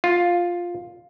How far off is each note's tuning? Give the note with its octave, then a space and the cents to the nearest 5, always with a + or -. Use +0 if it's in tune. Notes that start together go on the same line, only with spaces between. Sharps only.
F4 +5